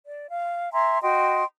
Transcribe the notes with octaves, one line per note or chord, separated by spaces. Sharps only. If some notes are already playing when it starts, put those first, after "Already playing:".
D5
F5
E5 G#5 A#5 C6
F#4 D#5 G5 C6